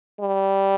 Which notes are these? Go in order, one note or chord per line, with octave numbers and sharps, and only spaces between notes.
G3